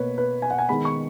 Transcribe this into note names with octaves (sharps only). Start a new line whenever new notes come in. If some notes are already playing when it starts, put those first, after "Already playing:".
Already playing: B2 A#3 B4 C#5
B4
G#5
F#5
G#5
D#3 G#3 B3 B5
C#6